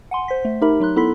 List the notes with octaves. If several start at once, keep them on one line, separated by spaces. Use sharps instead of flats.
F#5 G#5 C6
C5 B6
A3
D#4 G4 A#4 E5 B5
F#3 D#4 C6 F#6
B3 E4 A4 B5 C6 B6